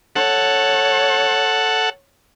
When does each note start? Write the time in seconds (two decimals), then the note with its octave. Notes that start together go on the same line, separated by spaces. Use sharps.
0.16 A4 C#5 F#5